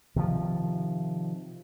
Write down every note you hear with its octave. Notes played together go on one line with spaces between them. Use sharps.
C3 D#3 F3